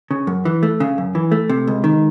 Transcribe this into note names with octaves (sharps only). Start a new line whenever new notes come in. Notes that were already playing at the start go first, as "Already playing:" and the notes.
C#3
F#2
E3
A3
C#3
F#2
E3
A3
C3
C#2
D#3